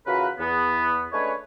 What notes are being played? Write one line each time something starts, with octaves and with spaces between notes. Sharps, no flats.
C#3 E3 F4 F#4 A#4 B4
E2 B3
G#3 A3 C#4 D4 B4 C#5